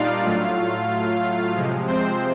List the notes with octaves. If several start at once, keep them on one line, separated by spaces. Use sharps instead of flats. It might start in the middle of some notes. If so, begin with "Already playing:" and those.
Already playing: A#2 G3 D4 D#4 F4 D5 F5
A2 F#3 A3
C3 F3 G#3
C4 C5